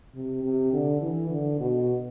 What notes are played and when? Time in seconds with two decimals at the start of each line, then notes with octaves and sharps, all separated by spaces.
0.16 C3
0.44 C3
0.73 D3
1.01 E3
1.30 D3
1.60 B2